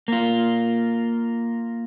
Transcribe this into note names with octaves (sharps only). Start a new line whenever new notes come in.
A#3 F4